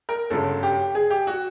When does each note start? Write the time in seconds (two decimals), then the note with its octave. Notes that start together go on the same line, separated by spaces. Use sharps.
0.09 A#4
0.30 G1 F#2 C#3 F#3 A4
0.63 G4
0.95 G#4
1.10 G4
1.27 F#4